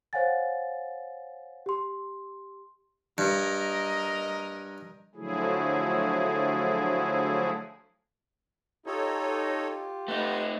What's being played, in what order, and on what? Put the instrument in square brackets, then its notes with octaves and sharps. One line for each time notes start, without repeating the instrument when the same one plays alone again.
[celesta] C5 C#5 F5 F#5 G#5 A6
G4 C6
[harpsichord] G2 [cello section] A#4 D#5
[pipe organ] D3 F3 F#3 A3 E4 G#4
[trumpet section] D#4 [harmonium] F4 G4 [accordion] A4 C#5
[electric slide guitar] A3 D#4 [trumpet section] B4 [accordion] F#5